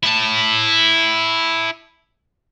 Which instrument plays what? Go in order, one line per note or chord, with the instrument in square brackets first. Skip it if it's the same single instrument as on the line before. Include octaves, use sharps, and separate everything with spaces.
[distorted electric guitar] E4 A5